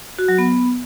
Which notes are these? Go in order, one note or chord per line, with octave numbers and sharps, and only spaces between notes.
F#4
F#3
B3